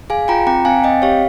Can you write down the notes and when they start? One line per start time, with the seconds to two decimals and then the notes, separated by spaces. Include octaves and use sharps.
0.10 G#4 F5 G#5
0.28 F4 G5 A#5
0.47 C4 G5 A#5
0.65 C4 F5 G#5
0.84 C4 D#5 G5
1.02 G4 C#5 F5